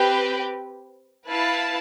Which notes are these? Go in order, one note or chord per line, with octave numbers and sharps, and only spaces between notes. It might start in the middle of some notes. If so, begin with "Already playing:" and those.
Already playing: C4 G4 B4
E4 B4 F5 A5